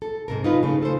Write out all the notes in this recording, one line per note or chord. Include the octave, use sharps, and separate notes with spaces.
A4
G#2 C3 A#4
D#4 F4 B4
C#3 A3
A4 C5